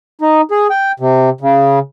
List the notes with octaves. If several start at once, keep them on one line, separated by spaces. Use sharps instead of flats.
D#4
G#4
G5
C3
C#3